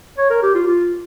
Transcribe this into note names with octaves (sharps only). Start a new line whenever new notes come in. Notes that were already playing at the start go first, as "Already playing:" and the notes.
C#5
A#4
G4
F4
F4